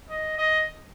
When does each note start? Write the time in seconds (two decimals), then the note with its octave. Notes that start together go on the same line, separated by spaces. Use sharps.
0.10 D#5
0.38 D#5